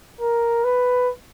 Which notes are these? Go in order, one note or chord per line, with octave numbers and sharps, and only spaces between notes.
A#4
B4